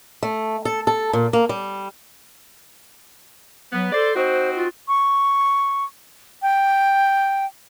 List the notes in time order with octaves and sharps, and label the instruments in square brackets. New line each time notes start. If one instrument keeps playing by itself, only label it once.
[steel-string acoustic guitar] A3
A4
A4
A#2
A#3
G3
[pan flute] F#3 [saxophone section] B3
[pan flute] A4 [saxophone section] C5 D5
[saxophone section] C4 D#4 F#4 [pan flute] C5
[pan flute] F4
[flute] C#6
G5